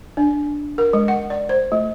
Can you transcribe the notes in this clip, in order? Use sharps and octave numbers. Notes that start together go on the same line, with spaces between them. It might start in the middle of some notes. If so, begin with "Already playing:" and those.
D4
A#4
G#3
F#5
D5
C5
A3